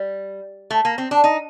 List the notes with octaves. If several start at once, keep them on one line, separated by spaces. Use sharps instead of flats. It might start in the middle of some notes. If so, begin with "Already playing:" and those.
Already playing: G3
A3
A#3
C4
D4
D#4